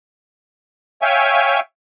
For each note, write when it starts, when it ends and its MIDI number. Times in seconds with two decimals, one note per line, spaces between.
1.02 1.60 73
1.02 1.60 76
1.02 1.60 77
1.02 1.60 79
1.02 1.60 80
1.02 1.60 85